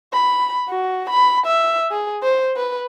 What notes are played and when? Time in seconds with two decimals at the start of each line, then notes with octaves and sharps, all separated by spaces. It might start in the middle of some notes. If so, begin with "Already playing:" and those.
0.13 B5
0.68 F#4
1.10 B5
1.46 E5
1.91 G#4
2.23 C5
2.56 B4